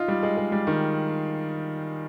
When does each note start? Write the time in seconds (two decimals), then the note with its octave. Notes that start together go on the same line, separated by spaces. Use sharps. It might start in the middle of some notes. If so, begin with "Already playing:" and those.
Already playing: D#4 F4
0.08 G3
0.23 G#3
0.37 G#3
0.52 G3
0.67 D#3